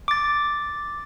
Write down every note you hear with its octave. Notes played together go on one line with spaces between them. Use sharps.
D6 A6